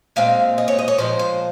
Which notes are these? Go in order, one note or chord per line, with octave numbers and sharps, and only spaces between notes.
A#2 G#3 C4 F5
D#5
C#5
D#5
C#5
A#2 F3 G#3 C5
C5